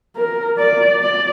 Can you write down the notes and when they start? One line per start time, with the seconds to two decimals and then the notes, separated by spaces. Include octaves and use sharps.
0.16 A#4
0.58 D5
1.01 D5